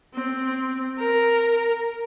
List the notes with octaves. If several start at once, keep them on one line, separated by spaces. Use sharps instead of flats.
C4
A#4